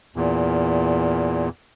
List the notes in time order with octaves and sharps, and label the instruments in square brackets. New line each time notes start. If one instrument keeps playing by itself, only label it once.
[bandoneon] E2 A#2